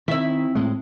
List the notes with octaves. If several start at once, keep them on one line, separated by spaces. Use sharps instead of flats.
D#3 C4 E4 E5
A2 G#3